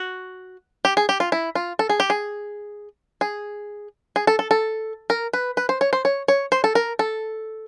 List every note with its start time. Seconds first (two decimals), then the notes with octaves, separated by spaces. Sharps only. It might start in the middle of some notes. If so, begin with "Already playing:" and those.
Already playing: F#4
0.85 G4
0.97 G#4
1.09 G4
1.20 F4
1.32 E4
1.55 F4
1.79 A4
1.89 G#4
2.00 G4
2.10 G#4
3.21 G#4
4.16 G#4
4.27 A4
4.39 A4
4.51 A4
5.10 A#4
5.33 B4
5.57 B4
5.69 C5
5.81 C#5
5.93 C5
6.05 C#5
6.28 C#5
6.52 C5
6.64 A4
6.75 A#4
6.99 A4